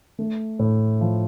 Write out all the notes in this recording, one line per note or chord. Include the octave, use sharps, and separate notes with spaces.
A3
A2
F3